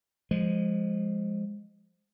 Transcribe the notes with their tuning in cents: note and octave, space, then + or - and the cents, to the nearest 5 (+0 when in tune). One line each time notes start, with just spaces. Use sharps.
F3 +0 G#3 -10